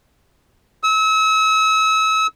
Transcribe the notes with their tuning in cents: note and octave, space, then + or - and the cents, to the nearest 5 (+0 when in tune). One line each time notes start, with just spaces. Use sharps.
E6 -35